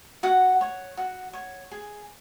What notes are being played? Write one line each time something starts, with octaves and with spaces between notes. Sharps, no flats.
F#4 F#5
C#5
F#4
C#5
G#4